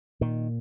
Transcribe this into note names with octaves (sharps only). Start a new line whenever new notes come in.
A#2 D#3